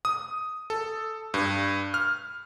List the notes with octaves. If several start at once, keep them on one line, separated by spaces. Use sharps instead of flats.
D#6
A4
G2
F6